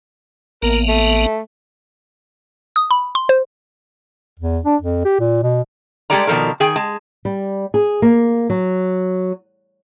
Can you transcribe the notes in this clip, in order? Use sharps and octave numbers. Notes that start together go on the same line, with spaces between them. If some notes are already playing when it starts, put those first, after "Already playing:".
A1 A#3 B3 A#4
A3
D#6
B5
C6
C5
E2
D4
F2
G4
A#2
B2
G3 G#3 G4 A4 D5 A#5
B2 D#3 F3 A4 A#4
D#3 G#4 G5 G#5
G#3 A5
G3
G#4
A#3
F#3